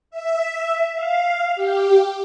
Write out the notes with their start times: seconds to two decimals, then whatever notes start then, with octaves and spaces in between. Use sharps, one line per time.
0.10 E5
0.95 F5
1.55 G4